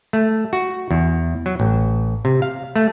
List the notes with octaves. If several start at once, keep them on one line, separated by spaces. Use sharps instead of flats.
A3
F#4
E2
F#3
A1
C3
F5
A3